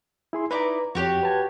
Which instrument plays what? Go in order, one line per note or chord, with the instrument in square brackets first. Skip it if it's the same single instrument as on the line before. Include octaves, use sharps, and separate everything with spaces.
[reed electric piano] E4 G#4 C6
[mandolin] D#4 E4 D5 [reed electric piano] B4 A#5
[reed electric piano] F2 [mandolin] F#4 G4 C#5
[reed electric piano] B4 A5 G#6